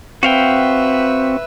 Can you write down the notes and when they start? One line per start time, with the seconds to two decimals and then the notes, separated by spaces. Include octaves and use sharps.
0.23 C4 F#4 B4 E5 F5 G5